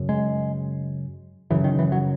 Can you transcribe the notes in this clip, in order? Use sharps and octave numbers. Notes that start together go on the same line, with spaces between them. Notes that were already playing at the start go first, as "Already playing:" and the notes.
Already playing: F#2 C#3
G#3
F#2 C#3 E3
D#3
E3
F#3